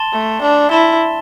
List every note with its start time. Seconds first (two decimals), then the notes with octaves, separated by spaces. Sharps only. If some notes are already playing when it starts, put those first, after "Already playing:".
Already playing: A5 C6 A6 E7 G7
0.13 A3
0.42 D4
0.71 E4 A5 C6 A6 E7 G7